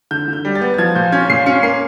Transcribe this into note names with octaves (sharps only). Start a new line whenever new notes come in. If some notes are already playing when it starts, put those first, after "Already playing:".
D3 G6
D3
G6
G3
A6
B3
A6
F3 G#6
A#2 G6
C#4 G#6
A#2 C7
C#4 C#7
A#3 C7